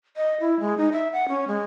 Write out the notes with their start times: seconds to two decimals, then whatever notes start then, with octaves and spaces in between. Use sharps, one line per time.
0.17 D#5
0.41 E4
0.60 G#3
0.78 D#4
0.92 E5
1.13 F#5
1.29 C#4
1.48 G#3